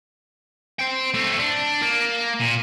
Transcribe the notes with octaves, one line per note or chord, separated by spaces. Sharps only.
C5 G5
A3 C4
D4
A#3
A#2